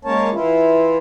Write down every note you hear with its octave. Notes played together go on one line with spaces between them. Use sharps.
G#3 A#3 C#4 A#4 C#5 A5
E3 E4 F4